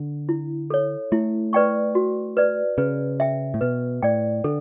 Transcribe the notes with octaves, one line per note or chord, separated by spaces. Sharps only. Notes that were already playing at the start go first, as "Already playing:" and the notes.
Already playing: D3
E4
A4 C#5
A3 E4
B4 D5 G5 C#6
F#4
B4 D5
C#3 B4
E5 G5
A2
B2 B4
A2 D5 G5
D3 A4